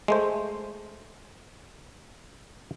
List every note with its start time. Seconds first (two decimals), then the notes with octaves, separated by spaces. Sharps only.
0.08 G#3 A3 C5